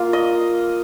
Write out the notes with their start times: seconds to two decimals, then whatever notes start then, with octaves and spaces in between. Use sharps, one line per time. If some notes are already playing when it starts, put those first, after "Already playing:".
Already playing: A#3 F4 F5
0.13 D#5